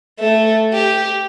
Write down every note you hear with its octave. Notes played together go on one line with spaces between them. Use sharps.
A3 E5
G4